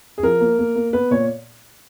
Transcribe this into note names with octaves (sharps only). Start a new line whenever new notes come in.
G#4
F3 A#4
A#3
A#3
A#3
B3 B4
A#2 C#5